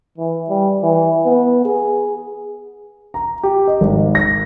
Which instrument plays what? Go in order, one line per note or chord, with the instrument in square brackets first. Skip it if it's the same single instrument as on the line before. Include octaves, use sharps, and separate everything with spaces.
[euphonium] E3
G3
E3
B3
G#4
[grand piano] A#5
G4
D#5
G#1
A#6